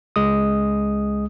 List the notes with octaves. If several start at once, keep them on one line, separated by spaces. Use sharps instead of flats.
C#2 G#3 D#6